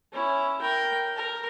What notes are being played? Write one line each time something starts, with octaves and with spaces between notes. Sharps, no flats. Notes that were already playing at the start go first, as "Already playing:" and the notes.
C#4 E4
A#4 G5
A#4